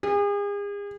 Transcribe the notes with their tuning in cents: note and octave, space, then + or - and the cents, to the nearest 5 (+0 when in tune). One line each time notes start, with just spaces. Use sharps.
G#4 -40